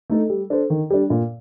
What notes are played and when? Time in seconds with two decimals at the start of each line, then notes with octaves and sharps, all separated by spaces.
0.10 A3 D#4 A4
0.30 G3
0.50 D4 A4 C5
0.70 D#3
0.90 G3 D4
1.10 A#2